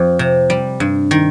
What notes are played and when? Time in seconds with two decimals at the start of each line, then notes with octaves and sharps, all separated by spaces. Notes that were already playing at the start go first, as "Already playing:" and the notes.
Already playing: F2
0.19 C3
0.50 G3
0.80 G2
1.11 D#3